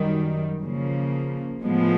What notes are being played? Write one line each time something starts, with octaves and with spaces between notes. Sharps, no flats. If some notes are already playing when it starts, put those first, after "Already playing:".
Already playing: F#2 D#3 G3
C#3 F3 A#3
A2 F3 G#3 B3